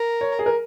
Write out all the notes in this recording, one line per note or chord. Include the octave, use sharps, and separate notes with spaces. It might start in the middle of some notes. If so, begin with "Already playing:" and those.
Already playing: A#4
C#5
G#4
A#4